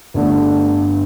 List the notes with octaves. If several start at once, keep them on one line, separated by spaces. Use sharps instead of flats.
G1 G2 D3 A3